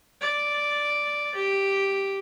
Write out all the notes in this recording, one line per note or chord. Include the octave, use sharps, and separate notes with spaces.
D5
G4